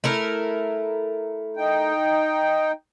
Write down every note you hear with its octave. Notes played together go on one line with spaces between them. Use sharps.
A3 E4 A#4
D#4 G5